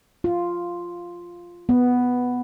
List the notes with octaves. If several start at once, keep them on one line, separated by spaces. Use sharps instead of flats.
F4
B3